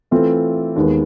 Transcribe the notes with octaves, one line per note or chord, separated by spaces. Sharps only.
E3 A3 C4 F4 A4
D#2 D#3 G#3 B3